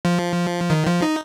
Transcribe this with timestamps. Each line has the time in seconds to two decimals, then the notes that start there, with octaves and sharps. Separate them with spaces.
0.05 F3
0.70 D#3
0.87 F3
1.02 D#4